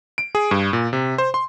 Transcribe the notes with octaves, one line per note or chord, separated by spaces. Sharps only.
D7
G#4
G2
A#2
C3
C5
C6